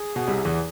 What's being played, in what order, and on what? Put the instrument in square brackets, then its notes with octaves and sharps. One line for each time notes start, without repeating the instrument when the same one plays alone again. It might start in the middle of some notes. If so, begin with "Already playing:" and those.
Already playing: [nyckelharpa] G#4
[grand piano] B2
C2 C3
E2 E3